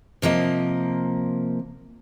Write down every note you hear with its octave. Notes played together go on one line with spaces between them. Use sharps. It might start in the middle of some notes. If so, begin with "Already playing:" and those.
C3 F3 A#3 D#5